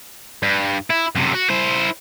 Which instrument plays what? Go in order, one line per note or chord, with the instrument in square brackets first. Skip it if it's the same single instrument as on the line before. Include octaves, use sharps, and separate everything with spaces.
[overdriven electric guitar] G2
E4
F#2 C3
F#4
E4 C5